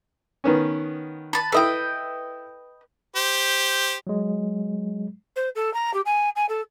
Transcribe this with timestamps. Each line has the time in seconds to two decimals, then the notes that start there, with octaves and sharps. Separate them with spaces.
0.44 D#3 B3 C#4
1.33 B4 A5
1.52 E4 A4 B4 D#5 G5
3.16 G4 C5
4.07 F#3 G#3
5.36 C5
5.55 A4
5.74 A#5
5.94 G4
6.06 G#5
6.36 G#5
6.49 A4